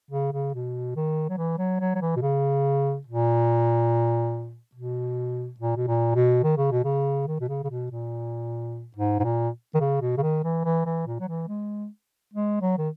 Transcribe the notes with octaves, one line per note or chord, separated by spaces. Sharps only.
C#3
C#3
B2
D#3
F#3
E3
F#3
F#3
F#3
E3
B2
C#3
A#2
B2
A#2
B2
A#2
B2
D#3
C#3
B2
C#3
D#3
B2
C#3
C#3
B2
A#2
G#2
G#2
A#2
D#3
C#3
B2
C#3
D#3
E3
E3
E3
A#2
F#3
E3
G#3
G#3
F#3
D#3